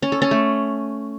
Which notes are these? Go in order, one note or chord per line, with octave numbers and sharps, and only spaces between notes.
C#4
A4
C#4
A3